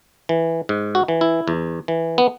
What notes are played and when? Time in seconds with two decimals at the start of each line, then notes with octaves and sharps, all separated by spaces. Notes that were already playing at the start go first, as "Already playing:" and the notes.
0.29 E3
0.69 G#2
0.95 F#4
1.08 E3
1.21 E4
1.48 E2
1.88 E3
2.18 B3